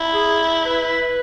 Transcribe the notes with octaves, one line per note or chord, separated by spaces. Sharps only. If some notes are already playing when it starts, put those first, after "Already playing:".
Already playing: E4
G#4
B4